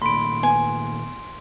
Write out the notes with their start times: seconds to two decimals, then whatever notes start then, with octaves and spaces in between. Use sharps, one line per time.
0.02 A#2 D#3 A3 B5 C6 D7
0.43 B3 G#5